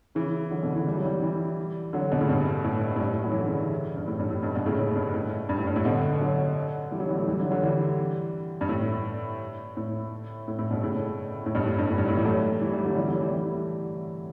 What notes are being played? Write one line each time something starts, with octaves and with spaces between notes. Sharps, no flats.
C#3 E3
D3 F#3
B2 D3
C#3 E3
G3
F#3
E3 G3
E3 G3
D3 F#3
B2 D3
A2 C#3
G2 B2
A2
A2
G2
A2
F#3
E3
D3
C#3 E3
G2
A2
G2
A2
G2 B2
G2 B2
A2 C#3
A2
G2
A2
G2
A2
G2
A2
B2 D3
D3 F#3
E3 G3
D3 F#3
E3 G3
F#3 A3
E3 G3
D3 F#3
D3 F#3
E3 G3
G2
A2
A2
A2
A2
G2 B2
A2 C#3
A2
G2 B2
A2
G2
A2
G2
A2
E3 G3
F#3 A3
E3 G3
E3 G3
D3 F#3
E3 G3
F#3 A3
E3 G3
E3 G3